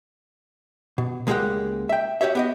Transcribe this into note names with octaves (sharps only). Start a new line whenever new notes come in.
B2
C#2 G#3 A#3 D#4 G4 F#5
E5 G5
F#4 G4 C#5 E5
B3 G4 D#5